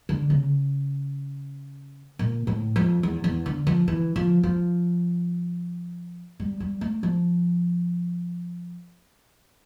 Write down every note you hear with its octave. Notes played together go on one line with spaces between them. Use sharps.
D3
C#3
A#2
A2
F2
E2
E2
D3
F3
E3
F3
F3
G3
G3
A3
F3